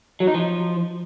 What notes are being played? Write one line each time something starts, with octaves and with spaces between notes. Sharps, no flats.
F#3
D#4
F3